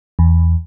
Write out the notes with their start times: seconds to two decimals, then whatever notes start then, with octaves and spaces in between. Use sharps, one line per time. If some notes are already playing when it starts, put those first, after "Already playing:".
0.19 E2